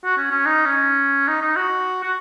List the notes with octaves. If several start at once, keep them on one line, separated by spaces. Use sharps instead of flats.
F#4
C#4
C#4
D#4
C#4
D#4
D#4
F#4
F#4